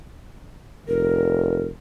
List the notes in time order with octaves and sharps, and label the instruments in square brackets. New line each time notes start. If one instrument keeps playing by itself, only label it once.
[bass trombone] F1 [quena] A#4